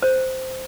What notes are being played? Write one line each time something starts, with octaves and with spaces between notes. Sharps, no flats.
C5